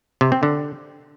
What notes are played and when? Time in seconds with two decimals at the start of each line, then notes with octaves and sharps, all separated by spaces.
0.21 C3
0.32 C4
0.43 D3